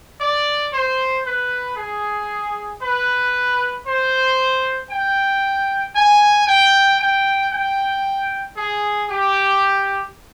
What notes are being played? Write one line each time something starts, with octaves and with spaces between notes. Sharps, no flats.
D5
C5
B4
G#4
B4
C5
G5
G#5
G5
G5
G5
G#4
G4